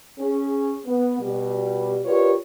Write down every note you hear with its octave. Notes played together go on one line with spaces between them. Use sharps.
C#4 G#4
B3
B2 G3
F4 G4 A#4 B4 C#5 D5